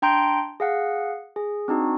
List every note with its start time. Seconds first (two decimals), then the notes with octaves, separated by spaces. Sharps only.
0.02 D4 G5 A#5 C6 G6 D7
0.60 G#4 F5 F#5
1.36 G#4
1.68 C4 D4 D#4 F#4